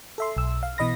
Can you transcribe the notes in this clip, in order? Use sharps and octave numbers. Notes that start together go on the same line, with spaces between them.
A4 E5 C6
B1 E6
F5
B2 E3 D#5 B5 A#6